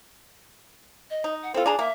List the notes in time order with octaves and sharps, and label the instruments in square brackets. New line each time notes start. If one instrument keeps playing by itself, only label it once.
[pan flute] D#5
[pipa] D#4
[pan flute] F#5
[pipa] C4 F4 [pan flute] A4
[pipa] D4 G#5 A#5 [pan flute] G#4
[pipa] A#3 [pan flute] E5